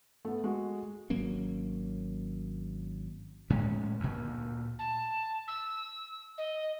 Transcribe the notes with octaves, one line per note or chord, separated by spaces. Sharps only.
A3 B3
G#3 F#4
G#1 F#3 A#3 C#4
A2 G#3 C#4
D2 A#2
A5
E6
D#5